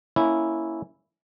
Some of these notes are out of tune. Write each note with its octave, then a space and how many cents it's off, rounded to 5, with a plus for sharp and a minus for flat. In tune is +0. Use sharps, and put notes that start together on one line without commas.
A#3 +0 C#4 +5 E4 -5